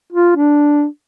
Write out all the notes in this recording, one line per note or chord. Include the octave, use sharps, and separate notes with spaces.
F4
D4